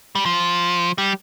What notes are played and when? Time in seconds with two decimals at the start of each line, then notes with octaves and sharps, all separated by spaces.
0.15 G3
0.26 F3
0.98 G3